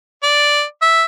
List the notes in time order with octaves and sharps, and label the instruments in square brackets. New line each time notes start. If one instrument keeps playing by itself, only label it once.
[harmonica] D5
E5